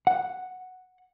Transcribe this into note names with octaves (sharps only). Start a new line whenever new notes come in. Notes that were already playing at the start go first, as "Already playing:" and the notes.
F#5